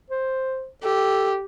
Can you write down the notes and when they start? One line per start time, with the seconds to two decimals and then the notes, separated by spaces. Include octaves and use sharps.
0.10 C5
0.83 G4 A4